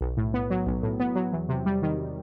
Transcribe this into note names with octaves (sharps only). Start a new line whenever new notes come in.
B1
A2
B3
F#3
B1
A2
B3
F#3
E2
C3
G3
D#3